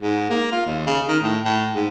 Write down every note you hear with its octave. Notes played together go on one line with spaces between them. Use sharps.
G#2
A#3
F4
D#2
C#3
D#3
A2
A2
G#2